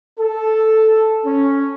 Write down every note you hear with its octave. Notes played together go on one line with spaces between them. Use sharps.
A4
C#4